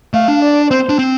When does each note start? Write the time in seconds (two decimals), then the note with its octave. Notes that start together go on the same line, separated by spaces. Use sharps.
0.14 A3 F5
0.28 D4
0.42 D5
0.70 C4 C5
0.89 D4
0.99 C4